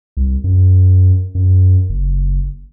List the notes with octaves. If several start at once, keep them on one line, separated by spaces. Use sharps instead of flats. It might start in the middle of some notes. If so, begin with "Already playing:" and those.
C2
F#2
F#2
F#1